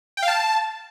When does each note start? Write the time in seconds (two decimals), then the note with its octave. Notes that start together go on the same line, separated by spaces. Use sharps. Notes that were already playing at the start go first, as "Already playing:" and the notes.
0.17 G5
0.22 F5
0.28 A5